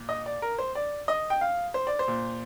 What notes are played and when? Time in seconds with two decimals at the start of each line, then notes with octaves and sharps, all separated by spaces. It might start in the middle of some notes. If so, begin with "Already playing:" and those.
Already playing: A#2
0.09 D#5
0.26 D5
0.42 A#4
0.59 C5
0.75 D5
1.08 D#5
1.30 G5
1.41 F5
1.74 C5
1.87 D5
1.99 C5
2.08 A#2